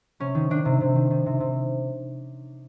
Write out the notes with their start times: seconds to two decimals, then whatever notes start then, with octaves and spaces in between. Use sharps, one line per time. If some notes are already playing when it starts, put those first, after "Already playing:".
0.20 C3 C#4
0.35 D#3
0.50 D#3 D4
0.65 C3
0.81 C3
0.96 D#3
1.11 D#3
1.26 C3
1.40 C3